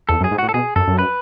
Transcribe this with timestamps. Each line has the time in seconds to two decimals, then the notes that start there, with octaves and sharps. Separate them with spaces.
0.09 E2 A4
0.21 F#2
0.24 G#4
0.31 G#2
0.38 A2 F#4
0.49 A4
0.54 B2 G#4
0.76 F#2 A4
0.88 F#2
0.99 B4